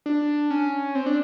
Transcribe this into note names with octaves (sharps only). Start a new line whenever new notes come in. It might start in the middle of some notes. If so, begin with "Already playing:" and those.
D4
C#4
C4
D4